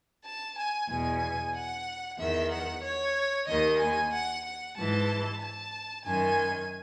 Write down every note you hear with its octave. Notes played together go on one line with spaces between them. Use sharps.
A5
G#5
E2 B2 G#5
F#5
E2 D#3 E5
F#5
C#5
D#2 D#3 D#5
G#5
F#5
F#5
G#2 E3 A5
A5
F#2 D#3 G#5